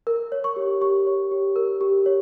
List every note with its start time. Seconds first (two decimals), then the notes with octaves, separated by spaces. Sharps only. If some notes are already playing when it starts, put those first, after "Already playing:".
0.07 A#4
0.32 C#5
0.44 C#6
0.56 G4
0.81 G4 C#6
1.06 C#5
1.31 G4
1.56 A#4
1.81 G4
2.06 C#5